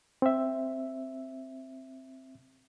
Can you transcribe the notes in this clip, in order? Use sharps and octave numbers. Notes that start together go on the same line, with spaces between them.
C4 E5